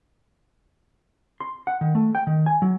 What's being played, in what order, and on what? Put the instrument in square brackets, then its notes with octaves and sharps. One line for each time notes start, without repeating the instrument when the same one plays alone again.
[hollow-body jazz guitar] C6
F#5
D#3
A3
G5
D#3
G#5
F#3